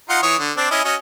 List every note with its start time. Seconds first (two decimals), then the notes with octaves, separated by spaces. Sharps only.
0.09 D#4 F4 F#5
0.23 E3 C#5 D#6
0.39 D3
0.57 C4 D4
0.71 C#4 E4 D#5
0.84 C#4 F#4 D#5